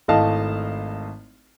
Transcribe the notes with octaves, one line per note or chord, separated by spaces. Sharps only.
G#1 A3 E4 D#5 F5 A5